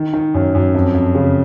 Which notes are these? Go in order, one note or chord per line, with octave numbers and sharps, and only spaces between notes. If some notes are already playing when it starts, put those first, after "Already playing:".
Already playing: D#3
D#3
F#2
F#2
F2
F2
C#3